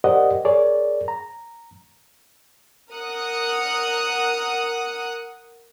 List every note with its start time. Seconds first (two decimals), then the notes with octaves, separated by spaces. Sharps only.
0.04 G4 A#4 C5 D5 D#5 F#5
0.45 G#4 A#4 C#5 D5
1.08 A#5
2.93 A#4 F#5 D#6 F#6 C#7